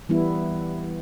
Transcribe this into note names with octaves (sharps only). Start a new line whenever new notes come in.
E3 G3 B3 E4